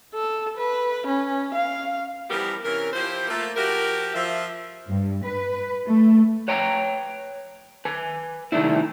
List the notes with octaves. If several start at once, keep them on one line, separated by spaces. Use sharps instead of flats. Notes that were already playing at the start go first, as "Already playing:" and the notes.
A4
B4
C#4
F5
E3 F3 G3 B3 G4 A#4
C3 E3 C#4 A#4
F3 E4 G4 C5
A3 A#3 F4
F3 F#4 G4 A#4
F3 E5
G2
B4
A3
B4 C#5 G5 A#5
B4 G#5
C3 D#3 G3 A3 D4 E4